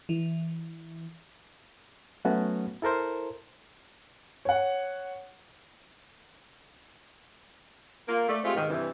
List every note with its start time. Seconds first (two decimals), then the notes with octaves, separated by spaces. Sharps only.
0.09 E3
2.25 F#3 A3 B3 C#4 F#4
2.82 E4 A4 A#4 C5
4.45 C#5 F#5
8.08 A#3 F4
8.29 A3 D5
8.44 G#3 A3 C4 F4 G4
8.56 G#2 B2 D#3
8.70 G2 C3 E3